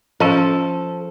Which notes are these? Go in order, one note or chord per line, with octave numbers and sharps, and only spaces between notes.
F3 C#4 A4 D#5